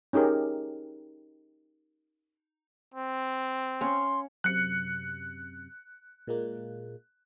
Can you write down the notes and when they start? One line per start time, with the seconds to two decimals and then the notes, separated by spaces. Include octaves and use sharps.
0.13 C#4 D#4 G4 G#4 A#4
2.94 C4
3.81 C#4 F5 C6
4.44 F#2 C3 F#6 C#7
6.27 A#2 G#3 A#3